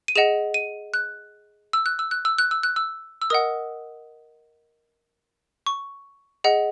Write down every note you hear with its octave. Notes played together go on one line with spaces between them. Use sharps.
D#7
G#4 D#5 F#5 E7
D#7
F#6
E6
F#6
E6
F#6
E6
F#6
E6
F#6
E6
E6
A#4 D#5 F#5 D#6
C#6
G#4 D#5 F#5